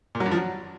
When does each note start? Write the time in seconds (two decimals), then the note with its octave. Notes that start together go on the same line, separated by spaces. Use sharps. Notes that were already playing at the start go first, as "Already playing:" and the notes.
0.15 A#2
0.20 F#3
0.26 G2
0.31 F3
0.37 F#3